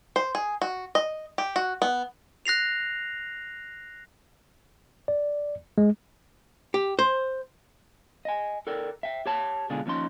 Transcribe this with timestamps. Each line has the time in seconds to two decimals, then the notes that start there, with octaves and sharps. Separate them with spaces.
0.16 C5
0.35 G#4
0.62 F#4
0.95 D#5
1.38 G4
1.56 F#4
1.82 B3
2.45 F#6 A#6 C7 F7
5.08 D5
5.78 G#3
6.74 G4
6.99 C5
8.25 D#5 G#5
8.67 A4 A#4 D5 G5
9.03 E5 G5
9.26 G4 C#5 A5
9.70 B2 D3 G#3 D4 F4 G#4
9.86 D#2 F3 C#4 D#4 C6